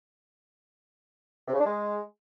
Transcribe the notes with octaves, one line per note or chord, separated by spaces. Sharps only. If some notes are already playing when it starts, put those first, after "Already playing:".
C3
C#3
D4
G#3